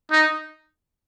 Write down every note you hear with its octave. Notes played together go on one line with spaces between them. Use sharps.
D#4